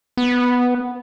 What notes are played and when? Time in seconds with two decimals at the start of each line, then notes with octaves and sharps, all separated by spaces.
0.17 B3